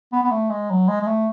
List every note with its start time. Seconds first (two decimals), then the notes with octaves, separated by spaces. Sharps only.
0.13 B3
0.23 B3
0.31 A3
0.50 G#3
0.70 F#3
0.88 G#3
1.01 G#3
1.07 A3